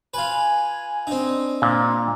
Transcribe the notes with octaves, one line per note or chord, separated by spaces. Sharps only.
F4 B4 G#5
C4 D4 D#4
A#2